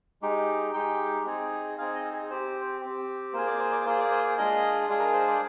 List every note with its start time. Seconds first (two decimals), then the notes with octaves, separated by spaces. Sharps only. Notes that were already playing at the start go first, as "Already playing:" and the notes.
0.22 G#3 D#4 G4
0.74 G#3 D#4 G4 G5
1.26 C4 D#4 G#4
1.78 C4 D#4 G#4 F5
1.95 D#5
2.13 G#4
2.30 C4 G4 C5
2.81 C4 G4
3.33 A#3 F4 G#4 C5
3.47 D5
3.59 C5
3.72 D5
3.85 A#3 F4 G#4 C5
3.98 D5
4.12 C5
4.38 G#3 D4 F4 G#4 D#5
4.89 G#3 D4 F4 G#4
5.00 A#4
5.14 C5
5.27 D5